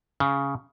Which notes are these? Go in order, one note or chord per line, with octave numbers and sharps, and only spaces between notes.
C#3